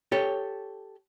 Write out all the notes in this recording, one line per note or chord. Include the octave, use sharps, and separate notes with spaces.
G4 A4 C#5